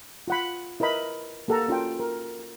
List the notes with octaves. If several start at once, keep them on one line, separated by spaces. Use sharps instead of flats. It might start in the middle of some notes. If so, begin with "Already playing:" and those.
F4 F#5 B5
E4 A#4 B4 D#5 B5
A#3 G4 A4 F#5 A5 A#5
C#4 F4 F#4 G5
A#4